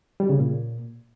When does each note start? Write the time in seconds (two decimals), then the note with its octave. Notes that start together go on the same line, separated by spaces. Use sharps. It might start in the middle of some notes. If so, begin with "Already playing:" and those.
0.20 G3
0.29 C#3
0.39 A#2